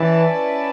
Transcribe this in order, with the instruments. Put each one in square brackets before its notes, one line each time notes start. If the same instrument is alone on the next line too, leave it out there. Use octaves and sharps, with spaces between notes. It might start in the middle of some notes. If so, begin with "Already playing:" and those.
Already playing: [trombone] E3 [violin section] C#4 E4 B4 D5 A5